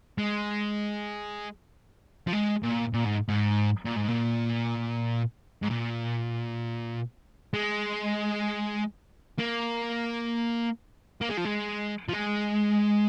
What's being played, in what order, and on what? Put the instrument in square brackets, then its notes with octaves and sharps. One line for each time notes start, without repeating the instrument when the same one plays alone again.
[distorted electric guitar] G#3
F3
G#3
A#2
A#2
G#2
G#2
A#2
G#2
A#2
G#2
A#2
G#3
A#3
A#3
G#3
F3
G#3
F3
G#3